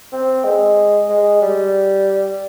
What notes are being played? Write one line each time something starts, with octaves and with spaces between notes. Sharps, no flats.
C4
G#3
G#3
G3